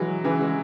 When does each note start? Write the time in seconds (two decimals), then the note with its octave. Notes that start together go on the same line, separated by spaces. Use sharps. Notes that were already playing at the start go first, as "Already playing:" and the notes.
Already playing: E3 F#3 G#3
0.24 C#3 E3
0.41 G#3